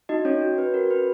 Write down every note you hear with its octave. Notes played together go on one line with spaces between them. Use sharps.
D#4 F#4 D#5
C#4 C#5
F#4
C#4 B4
F#4 A#4
C#4 B4